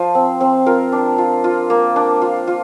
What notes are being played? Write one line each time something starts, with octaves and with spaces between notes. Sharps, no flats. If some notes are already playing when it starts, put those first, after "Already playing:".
Already playing: F3 C5
C4
C4
F4 A#4
D4
F4
F4
A#3
D4
F4
F4